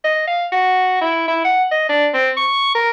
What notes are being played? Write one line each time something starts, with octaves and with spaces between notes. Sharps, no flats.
D#5
F5
F#4
E4
E4
F#5
D#5
D4
C4
C#6
A#4